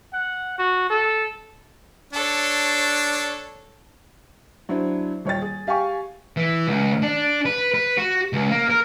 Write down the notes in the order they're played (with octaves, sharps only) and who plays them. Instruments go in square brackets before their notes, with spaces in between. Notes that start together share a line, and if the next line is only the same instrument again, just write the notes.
[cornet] F#5
F#4
A4
[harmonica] D4 [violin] A4 C#5
[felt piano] F#3 D4 E4 C5
D#1 C#5 G5 A6
G#4
G4 F5 G5 G#5 C#6
[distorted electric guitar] E3
C#2
D4
B4
B4
F#4
C#2
A#3
A#4